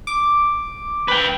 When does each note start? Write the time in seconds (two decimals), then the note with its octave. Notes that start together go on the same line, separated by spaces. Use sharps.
0.07 D6
1.08 B4 G5